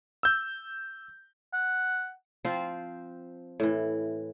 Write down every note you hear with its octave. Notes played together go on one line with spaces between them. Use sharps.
E6 G6
F#5
F3 C4 F4 C5
A2 E3